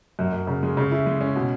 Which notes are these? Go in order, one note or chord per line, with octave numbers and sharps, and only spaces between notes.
F#2
F#2
C#3
G#3
C#3
E4
G#3
C#4
B2